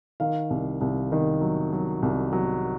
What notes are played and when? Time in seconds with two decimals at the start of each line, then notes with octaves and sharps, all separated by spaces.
0.20 D#3 F5
0.50 C2
0.81 C2
1.12 D#3
1.41 F#3
1.73 F#3
2.02 C2
2.33 F#3